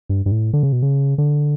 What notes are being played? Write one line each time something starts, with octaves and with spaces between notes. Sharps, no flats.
G2
G2
A2
D3
C#3
B2
C#3
D3